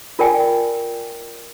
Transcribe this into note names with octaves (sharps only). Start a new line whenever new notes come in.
F4 A#4 D5 G5 G#5